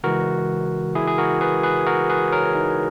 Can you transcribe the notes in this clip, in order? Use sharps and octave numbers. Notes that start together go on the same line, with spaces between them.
C#3 E3 G#3 F#4 A#4
E4 G#4
G#4
F#4 A#4
G#4 B4
G#4 B4
F#4 A#4
G#4 B4
A#4 C#5
D#4